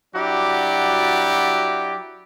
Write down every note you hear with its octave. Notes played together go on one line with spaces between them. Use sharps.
F#3 D4 E4 F#4 G4 D5